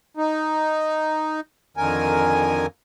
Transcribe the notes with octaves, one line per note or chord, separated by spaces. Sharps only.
D#4
F2 D3 D#3 A#4 G#5